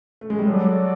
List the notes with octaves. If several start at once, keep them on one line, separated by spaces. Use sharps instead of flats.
A3
G#3
G3
F#3 F#4 A4 D5